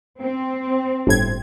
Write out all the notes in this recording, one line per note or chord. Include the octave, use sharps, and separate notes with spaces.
C4
G1 A2 G#6